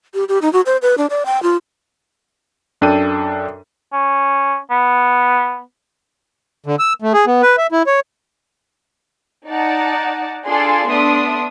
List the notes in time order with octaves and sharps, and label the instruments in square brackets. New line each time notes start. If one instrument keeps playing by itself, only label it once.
[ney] G4
G4
D#4
F#4
C5
B4
D4
D5
G5
F4
[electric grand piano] F#2 D4 A4 G5 D#7
[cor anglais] C#4
B3
[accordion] D3
E6
A3
G#4
B3
B4
E5
E4
C#5
[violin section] D#4 D5 F#5 A5
D4 F4 G#4 A4 D5 C6
A3 B3 D4 E5 C6 D#6